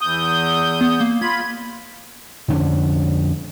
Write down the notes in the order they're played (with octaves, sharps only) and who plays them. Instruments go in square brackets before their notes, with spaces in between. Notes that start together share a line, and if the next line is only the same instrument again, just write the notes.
[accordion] E2 D#6 G6
[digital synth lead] B3
A#3
[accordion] F4 B5 [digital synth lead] G#6
[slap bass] F2 D3 C#4 D4